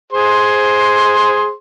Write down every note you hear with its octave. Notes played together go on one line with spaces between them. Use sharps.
G#4 C5 C6